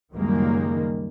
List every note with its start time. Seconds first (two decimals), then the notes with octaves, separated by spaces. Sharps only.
0.13 C#2 F#2 D#3 G3 G#3 A#3